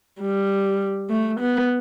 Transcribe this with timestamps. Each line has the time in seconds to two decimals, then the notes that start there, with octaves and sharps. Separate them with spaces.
0.21 G3
1.10 A3
1.40 B3